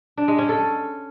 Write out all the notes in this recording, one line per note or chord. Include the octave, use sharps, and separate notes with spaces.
D4
G#3
C#4
A4